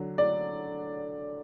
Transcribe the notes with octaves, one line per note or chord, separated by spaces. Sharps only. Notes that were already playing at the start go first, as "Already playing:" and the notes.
Already playing: D3 F#3
D5